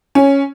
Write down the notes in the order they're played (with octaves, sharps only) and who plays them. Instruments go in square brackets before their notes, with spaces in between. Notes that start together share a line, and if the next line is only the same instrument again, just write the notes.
[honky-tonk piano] C#4